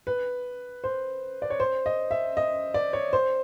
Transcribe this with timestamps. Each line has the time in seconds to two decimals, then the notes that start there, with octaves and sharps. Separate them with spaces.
0.07 B4
0.84 C5
1.42 D5
1.50 C#5
1.60 C5
1.86 D#5
2.11 E5
2.37 D#5
2.74 D5
2.93 C#5
3.13 C5